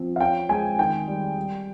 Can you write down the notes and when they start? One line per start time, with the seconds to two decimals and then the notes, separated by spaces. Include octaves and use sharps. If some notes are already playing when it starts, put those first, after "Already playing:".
Already playing: F3 C4
0.16 F5
0.20 C#4 G5
0.49 G#3 G#5
0.78 D#3 G5
1.08 G3
1.37 G3